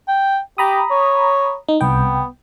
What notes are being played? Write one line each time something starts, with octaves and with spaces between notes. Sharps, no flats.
G5
G4 A#5 B5 D#6
C#5
D#4
C2 B3 G5